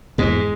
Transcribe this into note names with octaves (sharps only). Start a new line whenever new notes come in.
E2 G#2 G#3